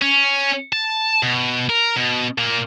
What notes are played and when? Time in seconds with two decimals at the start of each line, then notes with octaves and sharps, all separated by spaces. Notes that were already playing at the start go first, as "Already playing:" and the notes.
0.02 C#4
0.73 A5
1.23 B2
1.69 A#4
1.96 B2
2.38 A#2 A#3